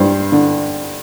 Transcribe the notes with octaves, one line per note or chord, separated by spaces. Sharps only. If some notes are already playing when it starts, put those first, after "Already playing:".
Already playing: G2 C5
D3